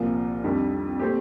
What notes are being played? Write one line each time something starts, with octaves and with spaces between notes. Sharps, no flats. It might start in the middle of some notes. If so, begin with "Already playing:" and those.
Already playing: C2 A#2 F3 A#3 F4
F2 D#3 G3 D4
A#2 A3 C4 G4